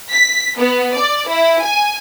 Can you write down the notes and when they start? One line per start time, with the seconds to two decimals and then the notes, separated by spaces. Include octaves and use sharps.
0.12 B6
0.58 B3
0.95 D5
1.28 E4
1.62 G#5